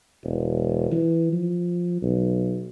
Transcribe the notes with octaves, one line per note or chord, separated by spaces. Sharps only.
E1
E3
F3
B1